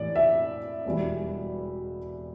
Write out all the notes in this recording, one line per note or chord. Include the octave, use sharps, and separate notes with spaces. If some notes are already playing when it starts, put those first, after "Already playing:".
Already playing: A2 E3 D5
E5
E1 E2 B2 G3